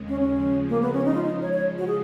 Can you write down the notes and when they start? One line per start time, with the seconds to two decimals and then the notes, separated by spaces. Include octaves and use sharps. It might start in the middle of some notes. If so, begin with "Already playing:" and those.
Already playing: D#2 C#3 G#3
0.09 C#4
0.20 C#4
0.33 C#3 F3 G#3
0.69 A#3
0.81 B3
0.93 C#4
1.05 D#4
1.14 F4
1.24 D#4
1.42 C#5
1.53 C#5
1.78 F#4
1.87 G#4